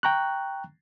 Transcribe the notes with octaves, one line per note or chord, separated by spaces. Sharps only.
G5 A#5 C#6 F#6